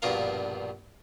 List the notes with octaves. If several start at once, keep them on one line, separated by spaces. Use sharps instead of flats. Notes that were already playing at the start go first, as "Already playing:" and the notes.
A#1 G2 B2 F4 A#4 F5